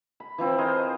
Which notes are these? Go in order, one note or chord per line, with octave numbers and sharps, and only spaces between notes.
B5
E3 F3 C4 E4
G#4 A#4 C5 D#5